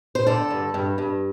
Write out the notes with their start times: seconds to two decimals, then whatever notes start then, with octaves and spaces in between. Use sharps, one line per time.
0.15 C5
0.26 D3 A4
0.51 G2
0.74 G2
0.98 G2